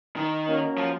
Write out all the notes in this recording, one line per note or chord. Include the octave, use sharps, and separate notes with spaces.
D#3
A#3 C#4 F#4 A#4 C#5
F3